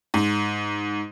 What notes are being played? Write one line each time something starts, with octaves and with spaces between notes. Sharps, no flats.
G#2